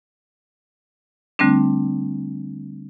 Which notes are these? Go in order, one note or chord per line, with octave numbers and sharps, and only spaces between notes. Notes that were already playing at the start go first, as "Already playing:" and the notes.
D3 G3 A3 C4 D4